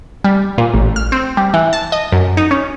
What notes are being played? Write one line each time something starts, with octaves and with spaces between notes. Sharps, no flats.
G3
A#2
A1
F6
C4
G3
E3
A5
D#5
F#2
D#4
C#4